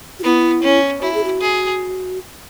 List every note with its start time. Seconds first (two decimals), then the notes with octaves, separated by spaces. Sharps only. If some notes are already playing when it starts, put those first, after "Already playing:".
0.19 F#4
0.24 B3 E4
0.63 C#4
1.01 E4 F#4
1.14 G#4
1.24 F#4
1.41 G#4